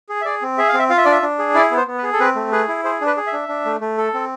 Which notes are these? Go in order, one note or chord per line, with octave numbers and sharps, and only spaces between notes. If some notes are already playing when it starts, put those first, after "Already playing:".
G#4
E5
G#4 D5
C4
G#4 E5
F5
C4
E5
F4 F5
E5
D4 D5
E5
D4
G#4
E4 D5
B3
C5
B3
B4
G#4
A4
C4 B4
A3
G#4 B4
E4
G#4 C5
D4
B4
G#4
E5
D4
D4
A3
A3
A4
C4